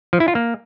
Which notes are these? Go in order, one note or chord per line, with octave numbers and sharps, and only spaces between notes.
F3
E4
F4
A#3